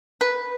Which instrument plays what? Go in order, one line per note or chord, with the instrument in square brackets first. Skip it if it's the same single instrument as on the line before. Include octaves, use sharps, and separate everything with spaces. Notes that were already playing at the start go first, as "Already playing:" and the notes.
[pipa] B4